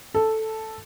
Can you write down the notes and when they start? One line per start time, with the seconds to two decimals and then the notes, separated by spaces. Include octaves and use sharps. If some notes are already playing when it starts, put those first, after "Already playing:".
0.14 A4